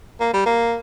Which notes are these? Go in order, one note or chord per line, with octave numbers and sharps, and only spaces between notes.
A#3
G3
A#3